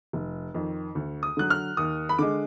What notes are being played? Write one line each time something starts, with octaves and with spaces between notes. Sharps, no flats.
F1
F2 D#3
D2
D#6
D3 F#3 F#6
F6
D#2 D#6
B5
D3 G#3 D6